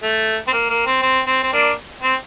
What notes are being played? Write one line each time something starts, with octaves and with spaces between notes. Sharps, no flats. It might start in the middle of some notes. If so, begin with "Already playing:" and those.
A3
C4
A#3
A#3
C4
C4
C4
C4
A#3 D4
C4